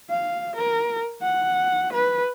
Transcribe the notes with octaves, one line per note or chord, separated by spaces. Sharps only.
F5
A#4
F#5
B4